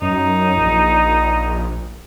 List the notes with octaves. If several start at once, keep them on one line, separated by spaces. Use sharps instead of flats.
F#2 D#4
A#1